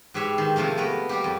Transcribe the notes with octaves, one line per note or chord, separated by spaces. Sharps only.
G#2 G4 B4 C#5 E5
D#3
C3 D#3 F3 A3 A#3
A3 B3 A#4 B4
G3 A#3 G4
F2